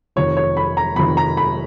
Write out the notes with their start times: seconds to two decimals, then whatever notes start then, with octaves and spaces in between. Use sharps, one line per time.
0.16 F1 F2 D#3 C#5
0.37 C#5
0.57 B5
0.77 A#5
0.96 F1 F2 D#3 B5
1.17 A#5
1.37 B5